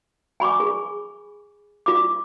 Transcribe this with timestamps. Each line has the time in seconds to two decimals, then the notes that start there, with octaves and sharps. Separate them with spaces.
0.40 G#5 B5 C#6 D6
0.60 G#4
1.86 F4 D6